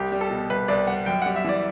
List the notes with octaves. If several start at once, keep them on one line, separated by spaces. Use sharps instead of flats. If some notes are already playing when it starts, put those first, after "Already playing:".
Already playing: C2 G4
G3
A4
B2
C2 B4
C2 D5
G3 F#5
F#2 G5
G3 F#5
E5
E3 D5